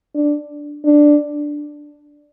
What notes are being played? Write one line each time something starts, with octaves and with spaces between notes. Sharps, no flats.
D4
D4